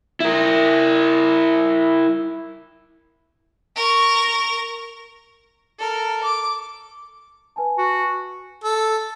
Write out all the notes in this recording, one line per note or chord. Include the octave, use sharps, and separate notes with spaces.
E4 A#4
A#4 C#6
A4 A#4
D6
B4 G#5 A5
F#4
A4